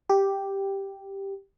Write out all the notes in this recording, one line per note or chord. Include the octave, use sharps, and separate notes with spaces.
G4